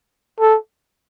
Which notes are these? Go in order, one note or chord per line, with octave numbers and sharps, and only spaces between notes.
A4